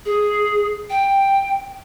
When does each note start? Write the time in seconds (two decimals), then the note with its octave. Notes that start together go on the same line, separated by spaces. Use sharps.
0.05 G#4
0.90 G5